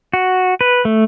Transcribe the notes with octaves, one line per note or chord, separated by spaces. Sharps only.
F#4
B4
A3